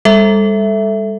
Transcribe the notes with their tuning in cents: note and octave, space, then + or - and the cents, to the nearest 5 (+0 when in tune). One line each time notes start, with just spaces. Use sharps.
G3 +45 A4 +0 E5 +0